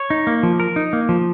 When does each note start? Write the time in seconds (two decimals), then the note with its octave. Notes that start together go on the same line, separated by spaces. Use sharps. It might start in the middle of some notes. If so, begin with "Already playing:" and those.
Already playing: C#5
0.10 D#4
0.27 A#3
0.43 F3
0.60 A#4
0.76 D#4
0.93 A#3
1.09 F3